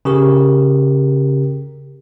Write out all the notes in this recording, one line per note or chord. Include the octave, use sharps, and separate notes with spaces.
C#3 G4 A#4